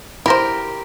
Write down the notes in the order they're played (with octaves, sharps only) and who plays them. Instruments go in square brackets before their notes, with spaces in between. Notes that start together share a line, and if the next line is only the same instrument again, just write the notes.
[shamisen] E4 C5 [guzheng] G4 A#4